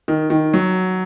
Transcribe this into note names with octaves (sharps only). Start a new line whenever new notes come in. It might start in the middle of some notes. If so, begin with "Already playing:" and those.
D#3
D#3
F#3